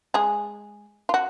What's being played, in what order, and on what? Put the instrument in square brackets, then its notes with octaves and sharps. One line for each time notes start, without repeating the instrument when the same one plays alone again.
[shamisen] G#3 G#4
F4
F#4